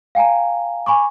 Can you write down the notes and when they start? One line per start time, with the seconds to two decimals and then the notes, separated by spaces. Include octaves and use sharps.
0.15 F5 G5 G#5 A#5
0.86 G#5 B5 C#6 D6